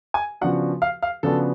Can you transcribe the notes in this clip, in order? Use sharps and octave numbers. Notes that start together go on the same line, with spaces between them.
G#5
C#3 F3 B3 D4 F#4 F#5
F5
F5
C#3 F3 B3 D4 F#4 A4